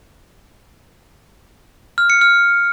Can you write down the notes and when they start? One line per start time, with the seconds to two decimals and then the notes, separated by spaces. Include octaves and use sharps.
1.98 F6
2.10 C#7
2.21 F6